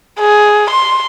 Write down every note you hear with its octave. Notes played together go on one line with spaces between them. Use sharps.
G#4
C6